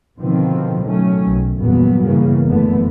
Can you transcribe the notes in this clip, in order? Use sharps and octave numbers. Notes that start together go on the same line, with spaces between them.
B2 D3 D#3 F3 B3 C4
D#3 F#3 A3 C#4
B1
G1 E2 A#2 F#3 B3
G2 C#3 E3 A#3 B3
F1 F#2 D3 E3 A3 B3